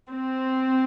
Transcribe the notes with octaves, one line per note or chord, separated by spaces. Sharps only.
C4